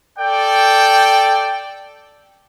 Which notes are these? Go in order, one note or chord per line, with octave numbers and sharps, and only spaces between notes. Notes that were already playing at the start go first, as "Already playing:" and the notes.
A4 D5 G5